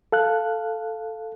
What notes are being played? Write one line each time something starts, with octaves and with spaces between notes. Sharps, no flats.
A4 F5 F#6